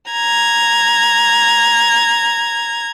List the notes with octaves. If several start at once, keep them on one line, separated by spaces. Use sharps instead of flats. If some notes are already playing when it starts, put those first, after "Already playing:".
A#5 G#6